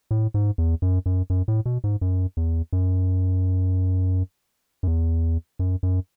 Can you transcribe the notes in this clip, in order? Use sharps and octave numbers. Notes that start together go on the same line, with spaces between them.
A2
G#2
E2
F#2
F#2
F#2
A2
B2
G#2
F#2
E2
F#2
F#2
E2
F#2
F#2